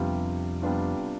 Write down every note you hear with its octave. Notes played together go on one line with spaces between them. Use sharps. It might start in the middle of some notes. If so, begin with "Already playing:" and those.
Already playing: F2 C3 G3 B3 D4 F4
C3 G3 B3 D4 F4